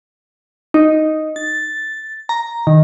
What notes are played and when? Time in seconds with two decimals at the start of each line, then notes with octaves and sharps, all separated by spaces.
0.74 D#4
1.36 A6
2.29 A#5
2.67 D#3